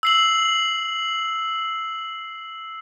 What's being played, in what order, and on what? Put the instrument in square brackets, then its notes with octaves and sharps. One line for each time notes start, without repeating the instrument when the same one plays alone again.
[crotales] E6 C7 F#7